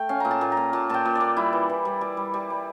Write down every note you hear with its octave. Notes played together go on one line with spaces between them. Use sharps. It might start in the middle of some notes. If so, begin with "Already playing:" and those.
Already playing: A3 G5
C#4 F5
A#2 A#5
A5
A#2
A#5
A#2
A#2 A5
A#2 G5 A5
A#2
D5
A#2
G3 E4
E3
E3
G3
G3
G3
G3
G3